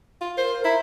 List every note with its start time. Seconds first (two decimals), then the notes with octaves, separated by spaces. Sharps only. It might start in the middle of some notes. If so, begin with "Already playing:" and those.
0.21 F4
0.37 A#4 C5
0.65 E4 A#5